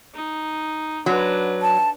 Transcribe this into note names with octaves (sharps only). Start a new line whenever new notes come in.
D#4
F#3 D4 B4
A5